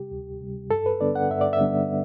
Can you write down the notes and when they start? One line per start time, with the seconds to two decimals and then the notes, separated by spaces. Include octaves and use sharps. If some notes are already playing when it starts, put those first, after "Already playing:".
Already playing: C3 G3 G4
0.12 D2
0.41 C3 G3
0.71 G2 A4
0.86 B4
1.01 D3 G3 B3 D4 D5
1.15 F#5
1.30 G2 E5
1.41 D5
1.53 E5
1.60 D3 G3 B3 D4